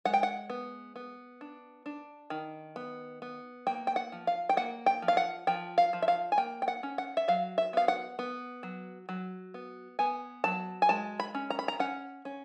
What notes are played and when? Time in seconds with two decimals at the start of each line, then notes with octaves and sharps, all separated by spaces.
0.05 G#3 F#5
0.13 G5
0.23 F#5
0.49 B3
0.96 B3
1.41 D4
1.86 D4
2.30 D#3
2.76 B3
3.22 B3
3.67 A#3 G5
3.87 G5
3.96 F#5
4.12 F3
4.27 F5
4.49 G5
4.57 A#3 F#5
4.86 G5
5.02 F3
5.08 F5
5.17 F#5
5.47 F3 G5
5.78 F5
5.93 F3
6.02 E5
6.08 F5
6.32 G#5
6.38 A#3 G5
6.62 G5
6.68 F#5
6.83 C#4
6.98 F#5
7.17 E5
7.28 F#3 F5
7.58 E5
7.73 B3 F5
7.88 F#5
8.19 B3
8.63 F#3
9.09 F#3
9.54 B3
9.99 B3 G#5
10.44 F#3 A5
10.82 G#5
10.89 G#3 A5
11.20 B5
11.35 C#4
11.50 A#5
11.59 B5
11.68 A#5
11.80 C#4 F#5
12.25 C#4